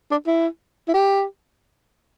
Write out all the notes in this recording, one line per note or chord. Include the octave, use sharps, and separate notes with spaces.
D4
E4
E4
G4